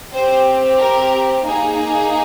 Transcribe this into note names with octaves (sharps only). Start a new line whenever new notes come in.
C4 G4 C5
A#4
A#3 D#4 G#4